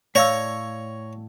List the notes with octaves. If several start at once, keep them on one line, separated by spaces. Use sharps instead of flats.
A2 C#5 D5 F5 A#5 E6